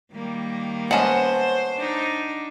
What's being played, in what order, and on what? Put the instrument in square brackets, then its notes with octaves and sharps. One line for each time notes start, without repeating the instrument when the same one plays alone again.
[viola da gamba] D#3 G3 A#3
[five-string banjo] G#3 B3 C#4 [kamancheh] C5 [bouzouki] F#5 A5
[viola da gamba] D4 D#4